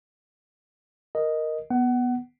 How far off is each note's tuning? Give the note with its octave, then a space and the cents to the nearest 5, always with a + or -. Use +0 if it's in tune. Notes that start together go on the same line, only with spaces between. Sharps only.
A#4 +0 D#5 +0
B3 -10 F#5 +25